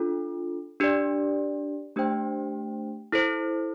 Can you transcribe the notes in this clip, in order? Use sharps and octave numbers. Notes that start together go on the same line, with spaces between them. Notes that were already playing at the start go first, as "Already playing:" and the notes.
Already playing: D4 F4 A4
D4 G4 D5
A3 D4 G4 C5 G5
E4 A4 C5